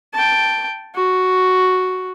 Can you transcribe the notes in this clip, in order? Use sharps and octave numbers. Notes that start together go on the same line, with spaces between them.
G5 A5
F#4